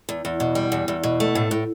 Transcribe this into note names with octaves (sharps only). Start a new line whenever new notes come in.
E2
E2
B2
G3
E2
E2
B2
A3
A2
A2